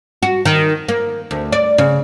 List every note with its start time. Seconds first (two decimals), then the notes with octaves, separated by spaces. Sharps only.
0.23 F#4
0.45 D#3
0.89 A#3
1.31 D2
1.52 D5
1.78 C#3